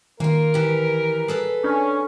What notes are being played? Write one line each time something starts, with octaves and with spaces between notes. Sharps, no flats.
D#3 A#3 F4 A#4
E3 G4
G#4 A4 B4
C#4 D4